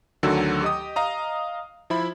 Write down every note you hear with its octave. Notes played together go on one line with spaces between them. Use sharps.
D2 D3 D#3 F#3 F#4 E6
G4 D#5 D#6
D#5 F5 A#5 D#6
F3 E4 B5